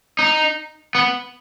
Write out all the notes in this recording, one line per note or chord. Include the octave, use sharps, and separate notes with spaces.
D#4
B3